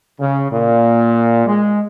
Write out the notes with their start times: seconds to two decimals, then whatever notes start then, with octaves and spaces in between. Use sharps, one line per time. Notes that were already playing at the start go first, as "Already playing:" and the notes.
0.19 C#3
0.51 A#2
1.46 G#3